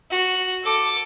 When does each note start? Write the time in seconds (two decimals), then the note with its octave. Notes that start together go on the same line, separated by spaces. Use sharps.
0.11 F#4
0.64 A4 D6